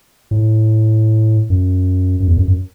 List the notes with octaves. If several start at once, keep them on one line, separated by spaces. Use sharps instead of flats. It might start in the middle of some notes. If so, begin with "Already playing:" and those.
A2
F#2
F#2
E2
F#2
F#2